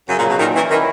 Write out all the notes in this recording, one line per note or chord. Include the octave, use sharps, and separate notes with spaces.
F#2 C#3
A#2
F#3
B2
A#2 D#3
E3 C#4
D#3 E4